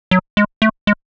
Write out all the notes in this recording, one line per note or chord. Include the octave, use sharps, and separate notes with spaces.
F#3
G#3
A3
G#3